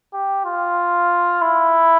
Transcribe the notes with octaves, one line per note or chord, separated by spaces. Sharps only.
G4
F4
E4